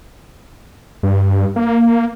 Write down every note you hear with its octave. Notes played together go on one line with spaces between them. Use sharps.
G2
A#3